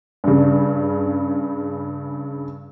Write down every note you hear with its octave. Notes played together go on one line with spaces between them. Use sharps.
G2 C#3